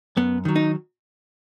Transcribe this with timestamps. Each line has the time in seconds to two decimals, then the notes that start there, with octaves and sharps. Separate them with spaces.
0.17 F#2 B3
0.45 D#3 F#3
0.56 D#4